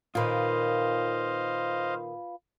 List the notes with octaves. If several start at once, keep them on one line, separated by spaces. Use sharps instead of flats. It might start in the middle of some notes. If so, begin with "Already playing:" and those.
A#2 D#3 F4 B4 C5 D#5 F5